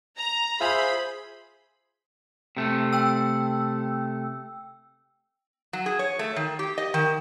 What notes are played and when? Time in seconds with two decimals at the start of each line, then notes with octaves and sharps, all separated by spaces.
0.17 A#5
0.61 F4 G#4 C5 E5 G#5 B5
2.57 C3 A3
2.93 G5 E6
5.73 F#3
5.86 G#4
5.99 C#5
6.19 A3
6.36 D#3
6.59 G4
6.78 D#5
6.94 D#3